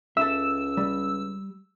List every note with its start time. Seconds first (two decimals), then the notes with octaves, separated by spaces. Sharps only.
0.17 C#2 A4 E5 E6
0.77 G3